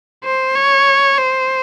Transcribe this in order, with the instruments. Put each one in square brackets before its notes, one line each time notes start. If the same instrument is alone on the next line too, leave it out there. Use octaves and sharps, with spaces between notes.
[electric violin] C5
C#5
C5